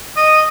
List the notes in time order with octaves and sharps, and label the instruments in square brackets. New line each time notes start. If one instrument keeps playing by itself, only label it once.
[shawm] D#5